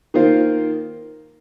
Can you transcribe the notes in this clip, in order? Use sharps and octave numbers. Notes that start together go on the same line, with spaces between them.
D#3 A#3 F4 C5